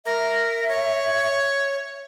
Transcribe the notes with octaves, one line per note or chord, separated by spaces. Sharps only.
A#4 E5
C#5